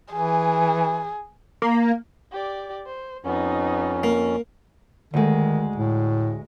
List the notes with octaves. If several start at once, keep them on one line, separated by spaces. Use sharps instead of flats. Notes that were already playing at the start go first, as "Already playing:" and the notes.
E3 G#4
A#3
G4 D5
C5
F2 B3 C#4 D#4
A#3
D2 D#3 G#3
A2